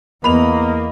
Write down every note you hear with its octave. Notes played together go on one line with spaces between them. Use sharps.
E2 A#3 B3 D#5 B5 F7